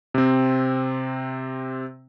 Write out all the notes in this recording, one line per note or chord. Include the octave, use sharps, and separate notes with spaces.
C3 C4